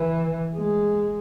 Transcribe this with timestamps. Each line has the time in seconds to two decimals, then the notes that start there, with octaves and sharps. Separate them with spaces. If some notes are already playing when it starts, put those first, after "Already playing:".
Already playing: E3
0.56 G#3